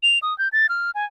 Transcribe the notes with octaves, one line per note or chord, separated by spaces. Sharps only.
F7
D#6
G6
A6
F6
G#5